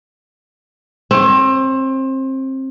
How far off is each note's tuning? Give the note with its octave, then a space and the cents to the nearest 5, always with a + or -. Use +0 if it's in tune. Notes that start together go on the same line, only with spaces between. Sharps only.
C4 +25 C#5 +0